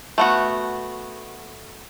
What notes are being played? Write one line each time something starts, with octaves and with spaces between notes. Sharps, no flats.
A3 B3 F#4